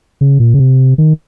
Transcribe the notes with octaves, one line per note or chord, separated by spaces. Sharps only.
C#3
A#2
C#3
C3
D#3